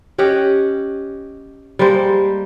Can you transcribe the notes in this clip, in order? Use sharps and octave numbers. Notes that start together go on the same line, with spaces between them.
C#4 G4 D#5 F#5
G3 G#3 A#3 C5